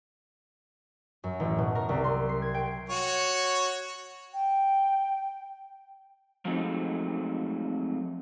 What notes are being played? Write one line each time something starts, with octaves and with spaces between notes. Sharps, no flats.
F#2
A1
B2
A#4
C2
C6
C7
G#6
G5
F#4 C#5
G5
F3 F#3 G#3 A3 C4 D#4